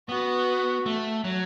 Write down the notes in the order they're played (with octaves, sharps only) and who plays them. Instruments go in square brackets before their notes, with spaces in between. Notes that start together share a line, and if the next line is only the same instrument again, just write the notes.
[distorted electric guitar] B3 [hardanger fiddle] F#4
[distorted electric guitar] A3
F#3